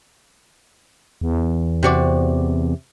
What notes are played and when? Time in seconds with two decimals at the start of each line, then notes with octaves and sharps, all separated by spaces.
1.21 E2
1.83 C3 F#4 D5